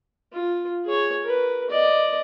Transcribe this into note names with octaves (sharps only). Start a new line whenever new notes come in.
F4
G#4 C#5
A#4 B4
D5 D#5